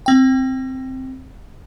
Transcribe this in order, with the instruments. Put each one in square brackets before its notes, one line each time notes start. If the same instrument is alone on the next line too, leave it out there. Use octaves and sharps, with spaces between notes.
[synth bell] C4 G5